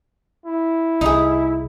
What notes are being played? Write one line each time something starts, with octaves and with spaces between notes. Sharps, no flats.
E4
C2 D#4 G#4